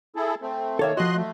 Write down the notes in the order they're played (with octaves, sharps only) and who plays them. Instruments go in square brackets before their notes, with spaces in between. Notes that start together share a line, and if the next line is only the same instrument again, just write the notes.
[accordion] E4 G#4 A4
A3 C4
[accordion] D#3 A#3 [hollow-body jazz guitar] A4 C#5 E5
[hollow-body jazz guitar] F3 F#4 [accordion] D#5 C6 F#6
[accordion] A3